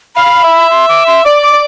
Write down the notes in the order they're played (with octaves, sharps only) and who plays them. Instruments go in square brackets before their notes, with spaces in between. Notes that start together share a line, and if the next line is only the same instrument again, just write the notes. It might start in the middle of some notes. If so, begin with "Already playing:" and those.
[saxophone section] F5 [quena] B5
[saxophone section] E5
[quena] C6
D6
C6
[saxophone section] D5 [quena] D6
[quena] D6
[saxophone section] D5